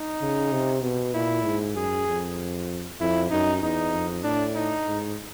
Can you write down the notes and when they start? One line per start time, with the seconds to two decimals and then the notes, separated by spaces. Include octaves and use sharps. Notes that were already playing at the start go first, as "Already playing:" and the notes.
Already playing: D#4
0.22 C#3
0.52 C3
0.83 B2
1.14 A#2 E4
1.45 G#2
1.76 F#2 G#4
2.07 F2
3.01 F2 E4
3.31 F#2 D#4
3.62 E2 D#4
3.93 F2
4.24 A2 D4
4.55 D#4
4.87 G#2